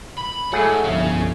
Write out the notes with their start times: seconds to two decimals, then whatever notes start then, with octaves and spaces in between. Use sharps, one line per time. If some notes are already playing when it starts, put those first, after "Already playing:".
0.17 B5
0.53 F#3 G#3 A3 G#4 F#5
0.84 G1 C2 F2 C#4 E5 F5